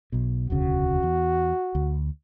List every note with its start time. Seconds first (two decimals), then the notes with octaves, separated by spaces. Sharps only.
0.12 B1 B2
0.50 E1 D2 C#3 F#4
1.03 E2
1.75 D2